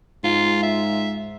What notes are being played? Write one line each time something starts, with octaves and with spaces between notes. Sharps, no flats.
G#2 F4
E5